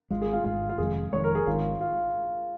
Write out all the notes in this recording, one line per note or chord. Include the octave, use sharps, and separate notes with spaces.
G#1 G#2 G#3 F4
G#4
F4
G#1 G#2 G#3 F4
F4
F1 F2 D#3 G#3 G#4
F1 F2 D#3 G#3 C#5
A#4
G#4
G#1 G#2 D#3 F4
F4